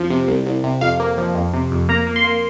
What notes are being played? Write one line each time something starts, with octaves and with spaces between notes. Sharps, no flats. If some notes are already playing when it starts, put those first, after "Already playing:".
Already playing: F2 F3
C3
C2
C2
C3
F2 F5
A#3
F3
F2
C3
F2
A#3 A#5
A#3
C6
A#3